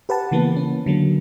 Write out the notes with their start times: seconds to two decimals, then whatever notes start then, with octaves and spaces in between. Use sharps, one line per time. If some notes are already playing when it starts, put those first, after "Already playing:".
0.09 G4 B4 F#5 A5
0.31 C#3 E3 A#3 B3
0.56 C#4
0.86 D3 F#3 A#3